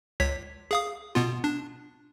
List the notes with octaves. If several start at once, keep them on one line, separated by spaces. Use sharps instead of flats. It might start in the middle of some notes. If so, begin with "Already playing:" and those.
C#2 C#5 B6
G#4 F5 D#6
B2 B3 F4
D4